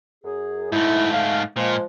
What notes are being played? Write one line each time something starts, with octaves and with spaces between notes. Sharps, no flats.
F#2 G#4
G#2 A3 E4
F5
A#2 F3 G#3